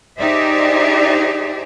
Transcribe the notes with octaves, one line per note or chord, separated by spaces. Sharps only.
D#4 G4 G#4 C5 D5 E5